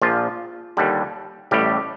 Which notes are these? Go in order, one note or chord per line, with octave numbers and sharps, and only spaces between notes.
A#1 A#2 F3 F4
D#2 D3 G3
A1 A2 G3 G4